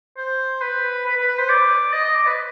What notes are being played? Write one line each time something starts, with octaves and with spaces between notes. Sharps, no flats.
C5
B4
B4
B4
B4
C5
D5
D#5
D#5
D5
B4